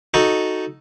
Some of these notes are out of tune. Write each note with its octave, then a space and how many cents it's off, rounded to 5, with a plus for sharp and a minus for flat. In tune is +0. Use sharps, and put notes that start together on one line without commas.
D#4 +0 F#4 +0 A4 +0